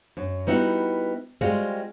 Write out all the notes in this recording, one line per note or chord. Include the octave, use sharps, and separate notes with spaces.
F#2
G3 B3 D#4 E4 F#4
G3 G#3 C4 F4 F#4 G#4